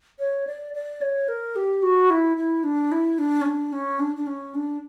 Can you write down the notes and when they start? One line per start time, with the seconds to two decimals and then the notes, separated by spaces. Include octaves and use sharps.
0.19 C#5
0.47 D5
0.74 D5
1.01 C#5
1.28 A#4
1.56 G4
1.83 F#4
2.10 E4
2.37 E4
2.64 D4
2.92 E4
3.18 D4
3.41 C#4
3.46 D4
3.73 C#4
3.99 D4
4.16 D4
4.27 C#4
4.55 D4